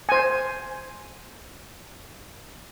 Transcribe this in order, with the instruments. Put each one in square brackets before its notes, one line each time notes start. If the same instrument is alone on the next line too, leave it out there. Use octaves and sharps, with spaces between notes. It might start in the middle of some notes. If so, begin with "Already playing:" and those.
[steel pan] C5 G#5